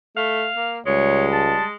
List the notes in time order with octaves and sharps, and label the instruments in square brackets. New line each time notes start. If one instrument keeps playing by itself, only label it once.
[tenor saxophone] A3 [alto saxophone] F5
[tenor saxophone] A#3
[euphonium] C#2 [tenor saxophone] G3 [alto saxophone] G#3 [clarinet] C#5
[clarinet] A5